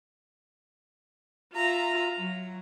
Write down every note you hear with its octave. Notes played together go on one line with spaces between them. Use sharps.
F4 E5 A#5
F#3